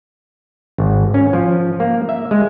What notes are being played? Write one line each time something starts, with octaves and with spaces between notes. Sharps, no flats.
G#1
C#4
F3
A#3
E5
G#3